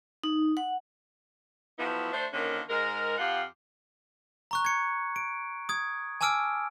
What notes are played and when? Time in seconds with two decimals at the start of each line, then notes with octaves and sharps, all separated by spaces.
0.24 D#4
0.57 F#5
1.78 F3 F#3 A3 B3 E4
2.11 A3 D4 C5
2.33 D3 D#3 F3 A#3 C#4
2.68 G#2 G#3 A#4
3.17 F2 F4 G4 F5 F#5
4.51 A#5 C#6 F#6
4.65 G#6 C#7
5.16 D7
5.69 D#6 G#6
6.21 G#5 A5 D6 E6 F6 D7